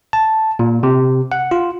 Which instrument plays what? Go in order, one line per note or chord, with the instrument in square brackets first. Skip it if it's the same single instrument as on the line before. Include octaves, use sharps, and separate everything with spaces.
[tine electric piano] A5
A#2
C3
F#5
F4